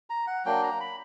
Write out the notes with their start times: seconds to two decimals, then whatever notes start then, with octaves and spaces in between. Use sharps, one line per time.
0.10 A#5
0.27 F#5
0.45 F#3 A#3 D4 G5
0.63 A#5
0.80 B5